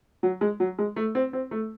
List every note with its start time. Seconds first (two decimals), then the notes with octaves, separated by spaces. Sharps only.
0.23 F#3
0.41 G#3
0.60 F#3
0.79 G#3
0.96 A3
1.15 C4
1.33 C4
1.51 A3